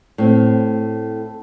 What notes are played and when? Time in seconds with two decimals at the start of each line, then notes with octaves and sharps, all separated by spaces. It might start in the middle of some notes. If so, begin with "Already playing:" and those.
0.18 A2 C4